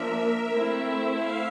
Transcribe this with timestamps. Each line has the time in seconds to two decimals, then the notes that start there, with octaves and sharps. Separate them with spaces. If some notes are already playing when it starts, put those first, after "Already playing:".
Already playing: F3 A#3 D4 A#4 E5
0.54 A3 C4 E4
1.17 F5